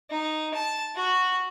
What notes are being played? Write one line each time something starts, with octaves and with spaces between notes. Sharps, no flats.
D#4
A5
F#4